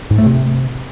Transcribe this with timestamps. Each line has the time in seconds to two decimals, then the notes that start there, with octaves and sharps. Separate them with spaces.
0.11 G#2
0.18 A3
0.26 C3